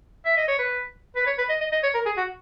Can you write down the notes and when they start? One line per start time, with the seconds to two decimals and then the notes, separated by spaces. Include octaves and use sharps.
0.26 E5
0.37 D#5
0.48 C#5
0.59 B4
1.16 B4
1.27 C#5
1.38 B4
1.49 D#5
1.61 D#5
1.72 D#5
1.83 C#5
1.95 A#4
2.06 G#4
2.17 F#4